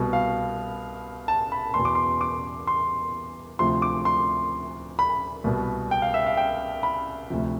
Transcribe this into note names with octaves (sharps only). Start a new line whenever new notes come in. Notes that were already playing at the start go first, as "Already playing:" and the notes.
Already playing: C2 B2
F5
A5
B5
E2 B2 C6
D6
C6
D6
C6
D2 C3 F3 C6
D6
C6
B5
C2 B2
G5
F5
E5
F5
G5
B5
D2 C3 F3